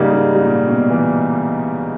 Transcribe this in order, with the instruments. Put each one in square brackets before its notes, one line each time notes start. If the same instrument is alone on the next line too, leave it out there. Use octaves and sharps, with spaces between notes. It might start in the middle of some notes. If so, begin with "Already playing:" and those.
Already playing: [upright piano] G#2 [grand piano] C#3 G3 A#3 D#4
[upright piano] G#2
G#2
A#2
B2
E3